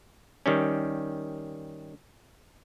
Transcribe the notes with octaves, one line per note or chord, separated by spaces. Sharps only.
D#3 G3 C#4